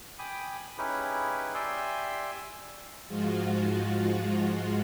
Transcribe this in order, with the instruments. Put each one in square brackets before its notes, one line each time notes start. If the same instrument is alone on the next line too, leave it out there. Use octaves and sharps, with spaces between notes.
[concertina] G5 G#5 B5 D6 D#6
C#4 D#4 E4 G4 G#4 B4
G4 D5 E5 G#5 C6 E6
[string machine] G#2 F3 G#3 F4 F#4